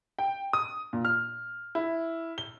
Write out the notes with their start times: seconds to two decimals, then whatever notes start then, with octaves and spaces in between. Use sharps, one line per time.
0.19 G5
0.53 D#6
0.93 A#2
1.05 F6
1.75 E4
2.38 G7